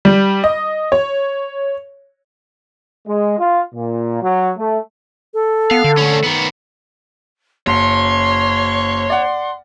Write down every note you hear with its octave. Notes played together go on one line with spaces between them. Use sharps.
G3
D#5
C#5
G#3
F4
A#2
F#3
A3
A4
B3 F5
D3
A3 C#4
D#3 B3
F#1 C#5 C6
D5 F#5